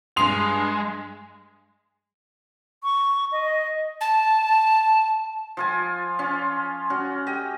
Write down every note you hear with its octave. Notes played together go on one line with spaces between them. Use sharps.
G2 G#3 C6 D#6 C7 F7
C#6
D#5
A5
F3 F4 G#5
C#4 F4
C#4 F#4
G4 D#5